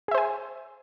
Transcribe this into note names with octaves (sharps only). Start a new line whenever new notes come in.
G#4 C5 E5 G#5